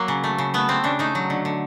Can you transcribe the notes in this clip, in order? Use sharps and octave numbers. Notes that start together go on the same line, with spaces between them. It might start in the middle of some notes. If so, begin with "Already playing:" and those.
Already playing: F#3 A#3
C#3
A3
C#3
A3 B3
A3 C4
C#3 D4
A3 D#4
F#3
D3
D3